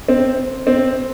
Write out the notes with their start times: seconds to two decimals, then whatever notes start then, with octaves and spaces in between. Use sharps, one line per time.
0.08 C4
0.67 C4